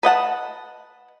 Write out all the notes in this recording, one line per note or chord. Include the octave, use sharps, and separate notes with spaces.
B4 D#5 F#5 A5